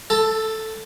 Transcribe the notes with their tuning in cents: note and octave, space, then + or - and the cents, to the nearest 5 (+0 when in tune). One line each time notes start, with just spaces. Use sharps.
A4 +0 A5 +25